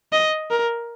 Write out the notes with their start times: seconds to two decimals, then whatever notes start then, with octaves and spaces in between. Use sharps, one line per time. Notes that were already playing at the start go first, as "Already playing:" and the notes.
0.13 D#5
0.51 A#4